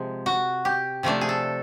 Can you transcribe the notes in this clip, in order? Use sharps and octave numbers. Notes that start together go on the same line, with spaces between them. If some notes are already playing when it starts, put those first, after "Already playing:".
Already playing: C3 F3 G#3
F#4
G4
C3 F3 A3 D4
G#4
A4